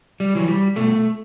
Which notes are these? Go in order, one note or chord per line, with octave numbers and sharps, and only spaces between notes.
G3
E3 F#3
G3
B2 A3